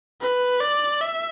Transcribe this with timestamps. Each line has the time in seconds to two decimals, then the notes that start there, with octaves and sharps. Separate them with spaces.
0.21 B4
0.61 D5
1.01 E5